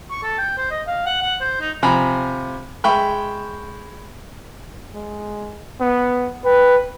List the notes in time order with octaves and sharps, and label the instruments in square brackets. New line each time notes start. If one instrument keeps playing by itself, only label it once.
[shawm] C#6
A4
G5
C5
D#5
F5
F#5
F#5
C5
D#4
[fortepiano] C3 F3 G#5 A#5 B5
G#3 E5 G5 B5 C#6
[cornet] G#3
B3
[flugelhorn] B4 [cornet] G5